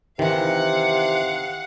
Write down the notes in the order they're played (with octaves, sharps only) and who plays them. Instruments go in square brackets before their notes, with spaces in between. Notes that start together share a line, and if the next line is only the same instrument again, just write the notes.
[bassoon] C3 [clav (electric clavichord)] D#3 E3 [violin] F5 F#5